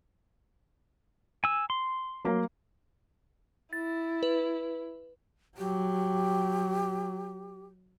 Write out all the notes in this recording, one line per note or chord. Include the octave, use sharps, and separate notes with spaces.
G#5 E6
C6
F#3 A#3
E4 A6
B4
F#3 G4